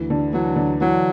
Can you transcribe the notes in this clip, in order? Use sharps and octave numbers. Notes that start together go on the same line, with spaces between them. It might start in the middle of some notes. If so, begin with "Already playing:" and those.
Already playing: D2 E3
D3
E3 F#3
D3
E3 F#3